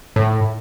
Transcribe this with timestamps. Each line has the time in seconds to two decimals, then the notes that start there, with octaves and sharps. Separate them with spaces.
0.16 A2